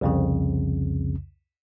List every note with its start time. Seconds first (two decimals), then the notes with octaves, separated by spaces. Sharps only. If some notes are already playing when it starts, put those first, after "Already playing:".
0.01 C2 F2 C#3